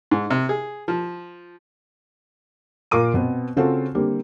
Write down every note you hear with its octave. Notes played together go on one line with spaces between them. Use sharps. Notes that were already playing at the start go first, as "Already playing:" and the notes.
G#2
C3
G#4
F3
A#2 F4 A#4 D6 D#7
B2 B3 C4
C#3 C4 F4 F#4 A4
D3 G3 A#3 C4